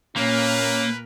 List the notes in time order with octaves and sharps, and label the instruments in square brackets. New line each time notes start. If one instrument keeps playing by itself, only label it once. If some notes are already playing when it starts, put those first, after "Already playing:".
[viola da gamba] A#2 A#4 [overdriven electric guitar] A#3 [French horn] C#4 [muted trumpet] B4